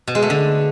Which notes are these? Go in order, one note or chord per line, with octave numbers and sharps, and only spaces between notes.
B2
G#3
A3
D3